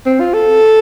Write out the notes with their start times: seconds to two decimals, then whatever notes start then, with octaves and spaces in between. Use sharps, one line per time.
0.06 C4
0.20 F4
0.34 A4